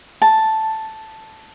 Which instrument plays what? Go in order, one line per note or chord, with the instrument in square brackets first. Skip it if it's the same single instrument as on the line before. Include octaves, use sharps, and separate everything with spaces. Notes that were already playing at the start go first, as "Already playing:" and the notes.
[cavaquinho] A5